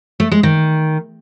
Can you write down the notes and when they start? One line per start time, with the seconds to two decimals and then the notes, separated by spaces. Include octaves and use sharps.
0.20 A3
0.31 G#3
0.43 D#3